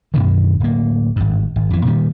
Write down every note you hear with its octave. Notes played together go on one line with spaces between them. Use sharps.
F#2 B2 D3 D#3
D1 A#3
G#1 G2
G#1
F2 E3
A#2 D#3 F#3 G3